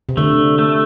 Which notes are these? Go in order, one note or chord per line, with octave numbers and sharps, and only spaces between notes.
C3
D3 A3
A3